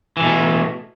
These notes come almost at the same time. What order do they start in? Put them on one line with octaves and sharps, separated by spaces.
E3 D#3 B2 A3